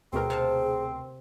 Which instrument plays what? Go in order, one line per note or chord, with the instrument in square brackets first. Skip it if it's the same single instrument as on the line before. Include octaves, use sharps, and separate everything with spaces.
[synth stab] D2 B2 A#4 [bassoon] C4 [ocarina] G#4
[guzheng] C3 F5 A5